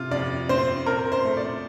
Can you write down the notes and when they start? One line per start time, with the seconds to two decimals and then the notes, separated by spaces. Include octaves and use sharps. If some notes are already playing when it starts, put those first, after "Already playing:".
Already playing: C3 F4
0.11 F2 D5
0.49 C4 C5
0.86 C4 A#4
1.12 C5
1.25 A3
1.37 D5